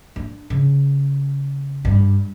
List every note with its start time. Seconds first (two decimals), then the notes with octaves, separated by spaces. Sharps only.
0.16 D4
0.50 C#3
1.85 G2